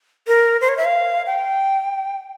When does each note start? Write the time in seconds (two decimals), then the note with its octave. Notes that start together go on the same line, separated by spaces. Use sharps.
0.27 A#4
0.61 C5
0.69 C#5
0.77 E5
0.85 F5
1.27 G5